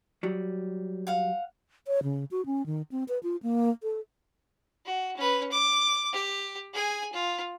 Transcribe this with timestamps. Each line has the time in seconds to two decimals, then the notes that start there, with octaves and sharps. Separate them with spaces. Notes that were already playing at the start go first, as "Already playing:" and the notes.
0.23 F#3 G3
1.07 F5 F#5
1.87 C#5
2.03 C#3
2.31 F#4
2.46 C#4
2.66 D#3
2.92 C4
3.08 B4
3.23 F4
3.43 A#3
3.83 A4
4.85 F#4
5.17 C#4 B4
5.52 D6
6.12 G4
6.73 G#4 G#5
7.13 F4